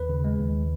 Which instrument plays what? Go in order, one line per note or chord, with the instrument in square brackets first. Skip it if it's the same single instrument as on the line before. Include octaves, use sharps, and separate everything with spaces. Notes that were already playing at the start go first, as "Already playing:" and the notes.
Already playing: [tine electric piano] D#2 B4
C#3
G#3
D#2